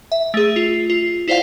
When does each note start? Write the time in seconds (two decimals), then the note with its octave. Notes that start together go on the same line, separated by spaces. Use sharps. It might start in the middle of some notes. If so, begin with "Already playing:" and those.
0.12 E5
0.34 A3 G#4
0.56 F4
0.90 F4
1.28 E4 F4 C5 D5 F5 F#5